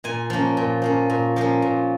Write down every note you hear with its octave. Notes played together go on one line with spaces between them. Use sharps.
A#2 G#5
F3 A#3 C#4
A#2
F3 A#3 C#4
A#2
F3 A#3 C#4
A#2